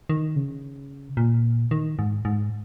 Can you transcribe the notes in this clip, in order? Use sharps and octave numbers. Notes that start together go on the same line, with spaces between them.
D#3
C#3
A#2
D#3
G#2
G#2